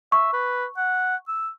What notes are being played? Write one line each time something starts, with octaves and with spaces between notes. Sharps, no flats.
E5 C#6
B4
F#5
E6